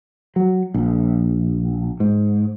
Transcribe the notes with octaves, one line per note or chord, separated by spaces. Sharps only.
F#3
A#1
G#2